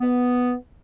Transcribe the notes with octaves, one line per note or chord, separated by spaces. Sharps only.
B3